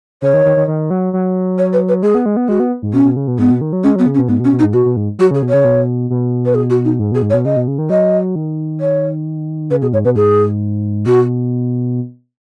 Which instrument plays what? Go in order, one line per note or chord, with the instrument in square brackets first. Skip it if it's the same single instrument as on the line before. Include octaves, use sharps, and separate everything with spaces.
[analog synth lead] C#3 [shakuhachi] C#5
[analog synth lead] D#3
D#3
D#3
D#3
F#3
F#3
[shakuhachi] C#5
B4
B4
[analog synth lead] G#3 [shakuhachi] G#4
[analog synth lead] B3
G#3
B3
[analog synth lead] G#3 [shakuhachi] F#4
[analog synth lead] B3
G#2
[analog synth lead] B2 [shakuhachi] C#4
[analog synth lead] B2
C#3
B2
[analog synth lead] G#2 [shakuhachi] B3
[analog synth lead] B2
D#3
F#3
[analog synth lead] G#3 [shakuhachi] C#4
[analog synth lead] F#3 [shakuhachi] B3
[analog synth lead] C#3
[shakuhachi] C#4
[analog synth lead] B2
[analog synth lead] G#2 [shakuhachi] B3
[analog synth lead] B2
[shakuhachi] C#4
[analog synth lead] B2
[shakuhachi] D#4
[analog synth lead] G#2
[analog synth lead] B2 [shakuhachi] F#4
[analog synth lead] B2
G#2
[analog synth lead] F#3 [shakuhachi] F#4
[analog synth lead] C#3 [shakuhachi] G#4
[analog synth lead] B2
[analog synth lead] C#3 [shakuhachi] C#5
[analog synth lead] B2
B2
[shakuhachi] B4
G#4
F#4
D#4
[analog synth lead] G#2
[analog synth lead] B2 [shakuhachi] G#4
[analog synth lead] G#2
[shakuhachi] C#5
[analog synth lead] B2
[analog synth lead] C#3 [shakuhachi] D#5
[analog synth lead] B2
C#3
D#3
[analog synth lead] F#3 [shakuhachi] D#5
[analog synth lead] D#3
[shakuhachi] C#5
[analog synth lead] C#3 [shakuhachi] B4
[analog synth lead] B2 [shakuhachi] G#4
[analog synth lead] G#2 [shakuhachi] C#5
[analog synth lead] B2 [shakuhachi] B4
[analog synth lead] G#2 [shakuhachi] G#4
[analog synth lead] B2 [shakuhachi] F#4